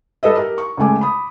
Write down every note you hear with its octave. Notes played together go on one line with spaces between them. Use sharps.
G3 A4 B4 D#5 E5
G4 A#4
C#6
C#2 C#3 A3 G#5 D6
B5 D#6